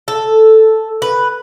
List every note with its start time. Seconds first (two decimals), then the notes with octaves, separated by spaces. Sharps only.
0.08 A4
1.02 B4